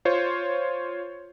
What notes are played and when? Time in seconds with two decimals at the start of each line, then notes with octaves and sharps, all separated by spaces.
0.05 F4 C5 C#5